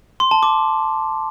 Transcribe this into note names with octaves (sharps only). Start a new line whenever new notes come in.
C6
A5
D6